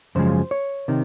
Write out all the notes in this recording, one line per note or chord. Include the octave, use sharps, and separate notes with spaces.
F#2 C#3 F3 G#3 C5
C#5
C3 D#3